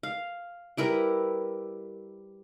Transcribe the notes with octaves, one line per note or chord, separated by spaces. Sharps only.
F5
G3 E4 A#4 B4